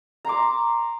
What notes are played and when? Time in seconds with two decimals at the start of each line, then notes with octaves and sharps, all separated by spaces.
0.25 A#5 C6 D6